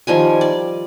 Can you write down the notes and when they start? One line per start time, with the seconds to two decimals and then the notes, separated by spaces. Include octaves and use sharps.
0.07 D#3 F3 G3 G#5
0.41 D5